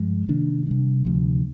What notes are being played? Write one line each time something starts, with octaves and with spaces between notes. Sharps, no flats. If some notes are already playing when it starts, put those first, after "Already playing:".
Already playing: G2 F3 G#3
C3 D#3 A#3 D4
C3 G3 D4
D2 C3 F3